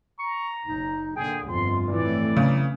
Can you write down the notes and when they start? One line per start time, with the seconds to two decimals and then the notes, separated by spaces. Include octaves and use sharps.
0.19 A#5 C#6
0.66 F#1 D#4
1.16 A#2 D3 G#4 G5
1.48 G1 F2 F4 C6
1.87 F2 A2 E3 D5
2.37 C#3 F#3